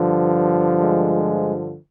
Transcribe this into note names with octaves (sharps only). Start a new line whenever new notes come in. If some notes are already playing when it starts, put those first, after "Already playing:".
Already playing: G2 D3 F3
G#3